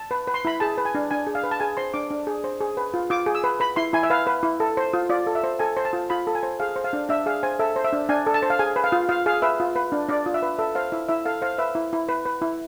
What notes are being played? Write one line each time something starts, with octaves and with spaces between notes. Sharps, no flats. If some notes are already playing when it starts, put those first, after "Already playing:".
Already playing: A5
B4
B4
C6
E4 B5
G#4 A5
B4
G#5
D4
D4 G#5
G#4
F5
B4
A5
G#4 G#5
C5 C6
D4 D6
D4
G#4
C5
G#4
B4
F4
F4 D6
G#4
E6
B4
B4 B5
E4 C6
E4 G#5
E5
B4 F5
B4
E4
A4
C5
F4
F4 D5
A4
E5
C5
A4 G#5
C5
A5
F4
F4 B5
A4
G#5
C5
G#4 F5
C5
F5
D4
D4 E5
G#4 F5
C5 G#5
A4 E5
C5
E5
D4
D4 G#5
A4
A5
C5
F5
G#4 G#5
B4
F5
F4
F4 F5
G#4 F5
B4 E5
F4
B4
D4
D4 D5
F4
E5
B4
A4 E5
C5 F5
E4 E5
E4 E5
A4 F5
C5 F5
B4 E5
E4
E4
B4
B4
E4